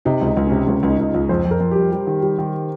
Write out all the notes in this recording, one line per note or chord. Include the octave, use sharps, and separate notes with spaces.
C3 D#4
C#2
D#4
C#2
C3 C#4
C#2 C#4
C#2 D#4
C#2 D#4
F4
C#2
F2 C5
F2
A#4
F2
G3 G4
G3
D#3
G3
D#3